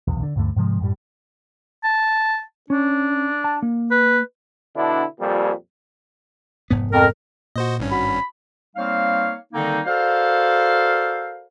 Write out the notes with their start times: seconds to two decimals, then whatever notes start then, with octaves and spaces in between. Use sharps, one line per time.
0.08 D#1 B1 E2
0.23 D3
0.36 D2 G2 D3 A3
0.56 G#2 C3 F3 G#3
0.80 F#2 A2 G3
1.84 A5
2.70 C#4 D4
3.44 A5
3.62 A#3
3.91 B4
4.75 B2 D3 D4 E4
5.19 F2 A#2 G3
6.70 F1 G#2 B3
6.92 F2 A#4
7.56 A#2 F#4 C5 D#5
7.80 G#1 G2 C#4
7.92 F#4 B5
8.76 G3 A#3 C4 D#4 C#5 F5
9.53 D3 D#3 G3 A#3 C4 D#4
9.85 F#4 A4 A#4 C5 D5 F5